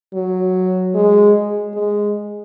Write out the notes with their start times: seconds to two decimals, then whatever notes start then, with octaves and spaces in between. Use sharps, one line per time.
0.14 F#3
0.95 G#3
1.75 G#3